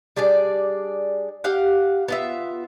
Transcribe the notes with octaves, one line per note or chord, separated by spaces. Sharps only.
G3 D4 G#4 D5
G4 F5 F#5
B3 F4 E5